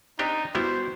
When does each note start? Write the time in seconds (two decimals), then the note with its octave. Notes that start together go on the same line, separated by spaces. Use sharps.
0.19 C4 D4 D#4 G4
0.55 G3 B3 E4 F#4 C5